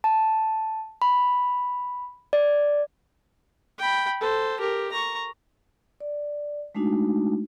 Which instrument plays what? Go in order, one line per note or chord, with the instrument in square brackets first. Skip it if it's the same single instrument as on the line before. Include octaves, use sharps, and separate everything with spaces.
[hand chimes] A5
B5
D5
[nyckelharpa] G5 B5
A4 C5
G4 A#4
A#5 C#6
[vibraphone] D5
G#3 A3 D4 D#4 F#4